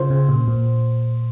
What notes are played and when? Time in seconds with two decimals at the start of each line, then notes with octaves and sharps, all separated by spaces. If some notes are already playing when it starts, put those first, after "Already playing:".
Already playing: C#3 F4 C5
0.10 C#3
0.29 A#2
0.48 A#2